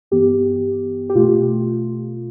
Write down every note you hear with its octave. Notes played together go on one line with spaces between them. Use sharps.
G2 E3 B3 G4
G4
B2 A3 F4